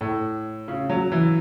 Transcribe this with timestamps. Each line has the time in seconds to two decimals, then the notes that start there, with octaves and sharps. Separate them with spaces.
0.01 A2
0.68 C#3
0.90 F#3
1.12 E3